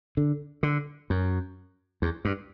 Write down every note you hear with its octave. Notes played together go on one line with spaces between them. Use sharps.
D3
D3
F#2
E2
G2